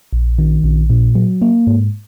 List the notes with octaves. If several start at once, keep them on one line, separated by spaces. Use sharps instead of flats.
A#1
D#3
A#1
A#2
F#3
A#3
G#2